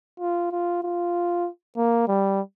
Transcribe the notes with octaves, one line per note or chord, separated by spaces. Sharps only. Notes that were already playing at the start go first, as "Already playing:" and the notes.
F4
F4
F4
A#3
G3